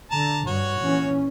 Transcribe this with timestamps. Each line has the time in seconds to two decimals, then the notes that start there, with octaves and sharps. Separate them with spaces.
0.12 D3 A5 A#5
0.47 G2 F#4 C#5
0.82 A#2 E3 C#4